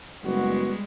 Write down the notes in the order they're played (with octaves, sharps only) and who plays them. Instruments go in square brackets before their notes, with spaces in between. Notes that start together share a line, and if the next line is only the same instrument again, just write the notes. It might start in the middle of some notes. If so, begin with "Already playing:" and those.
[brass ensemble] F#1 B3 F#4 [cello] G3 G#3